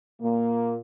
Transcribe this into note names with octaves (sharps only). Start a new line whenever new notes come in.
A#2 A#3